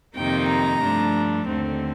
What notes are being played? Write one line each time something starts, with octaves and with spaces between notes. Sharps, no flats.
F2 C3 D#3 A#3 D#4 G5
A#5
G2 F3 A3 D4
D#2 D3 A3 C4